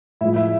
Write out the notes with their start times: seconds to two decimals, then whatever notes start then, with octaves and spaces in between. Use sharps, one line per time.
0.21 A2 F3 G#3 E4 E5
0.36 E4 E5